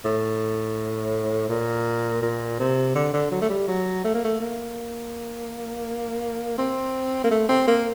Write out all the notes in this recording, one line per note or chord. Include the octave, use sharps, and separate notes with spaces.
A2
A#2
A#2
C3
D3
D3
F#3
A3
G3
F#3
A3
A#3
A3
A#3
C4
A#3
A3
C4
A#3